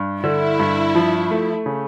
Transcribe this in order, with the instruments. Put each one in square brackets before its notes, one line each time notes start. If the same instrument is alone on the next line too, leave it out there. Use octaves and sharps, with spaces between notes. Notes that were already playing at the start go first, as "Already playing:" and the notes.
Already playing: [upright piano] G2
[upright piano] D3 [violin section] E4
[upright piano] G2
F3
A3
C#3